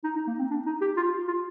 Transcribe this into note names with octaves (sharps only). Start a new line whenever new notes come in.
D#4
D#4
A#3
C4
D4
D#4
G4
F4
F4